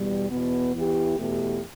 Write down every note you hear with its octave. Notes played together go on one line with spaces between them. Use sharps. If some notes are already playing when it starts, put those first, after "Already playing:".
Already playing: E2 B2 G3
E2 B2 B3
E2 E3 B3 E4 G4
E2 B2 A3 G4